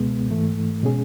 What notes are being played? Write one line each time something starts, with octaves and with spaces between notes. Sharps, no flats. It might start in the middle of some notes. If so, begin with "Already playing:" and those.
Already playing: C#2 B2 G#3 B3
G#2 E3 A3
B2 G#3 C#4 G#4